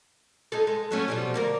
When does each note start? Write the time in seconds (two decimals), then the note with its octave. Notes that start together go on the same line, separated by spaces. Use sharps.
0.52 D#4 G#4 A4
0.67 G#3
0.91 F#3 A3 C#4
1.08 B2 F3 G3
1.34 D2 A#3 A#4